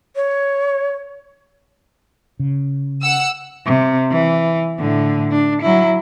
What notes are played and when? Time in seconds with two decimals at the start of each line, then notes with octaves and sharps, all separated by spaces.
0.16 C#5
2.40 C#3
3.02 F#5 E6
3.66 C3
4.11 E3
4.79 A2 D3
5.31 D4
5.62 F#3 E4